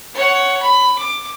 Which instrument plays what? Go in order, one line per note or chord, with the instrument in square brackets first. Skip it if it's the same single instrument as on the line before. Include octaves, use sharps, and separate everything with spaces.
[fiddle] C#5 F#5
B5
D6